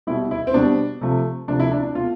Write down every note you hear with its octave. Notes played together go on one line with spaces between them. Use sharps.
B2 G3 E4
E4
C4
B2 G3 D4
C3 F3 A3
C3 F3 A3 D4
E4
D4
D4
B2 A3 F4